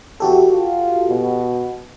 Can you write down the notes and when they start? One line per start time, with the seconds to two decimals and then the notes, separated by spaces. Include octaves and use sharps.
0.20 E2 F#4 G4 A4
0.52 F4
1.09 B2